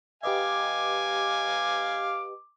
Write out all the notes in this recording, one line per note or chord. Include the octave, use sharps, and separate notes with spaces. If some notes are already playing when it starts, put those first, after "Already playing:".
G4 B4 D#5 F5 G#5 D6